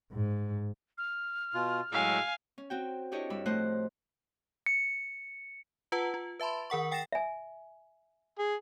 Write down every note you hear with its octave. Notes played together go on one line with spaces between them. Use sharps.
G#2
F6
B2 F4
A2 F#3 G#3 E5 F5 G#5
C#4
C4 F#4 G5
D4 E4 G4 A4 C#5 D#5
G2 G3 B5 E6
A2 F3 A3 C5 D#5 F#6
C#7
F4 B4 F#5 A5
F4
B4 E5 A5 B5 C6
D#3 A#4 F#5 C#6
F#5 G5 A6 A#6 C7 E7
E5 G#5
G#4